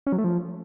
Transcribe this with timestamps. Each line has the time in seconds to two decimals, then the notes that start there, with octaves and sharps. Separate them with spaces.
0.07 C#4
0.12 F#3
0.18 A3
0.24 F3